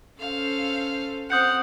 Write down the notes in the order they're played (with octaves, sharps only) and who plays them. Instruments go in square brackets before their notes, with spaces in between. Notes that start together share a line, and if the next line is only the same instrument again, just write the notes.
[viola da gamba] C#4 A4 C5 [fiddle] F5
[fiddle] C4 [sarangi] F#5 [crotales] D#6 G6 C#7